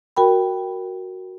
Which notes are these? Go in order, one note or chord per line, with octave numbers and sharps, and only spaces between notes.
F#4 A#4 G5 B5